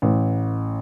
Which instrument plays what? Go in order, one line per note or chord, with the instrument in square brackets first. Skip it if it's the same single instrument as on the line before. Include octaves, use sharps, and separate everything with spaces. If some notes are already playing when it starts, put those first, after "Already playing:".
[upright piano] A1